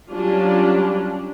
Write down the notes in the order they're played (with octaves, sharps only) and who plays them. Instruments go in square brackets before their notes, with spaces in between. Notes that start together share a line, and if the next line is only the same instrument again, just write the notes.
[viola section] F#3 G3 C#4 D4 F4